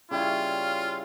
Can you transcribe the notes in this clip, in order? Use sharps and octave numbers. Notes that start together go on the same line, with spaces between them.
C#3 G3 E4 F4